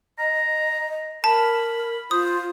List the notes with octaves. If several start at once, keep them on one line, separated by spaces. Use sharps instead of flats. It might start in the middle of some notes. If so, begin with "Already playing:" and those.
D#5 A#5
A#4 A5 B5
F4 C5 D#6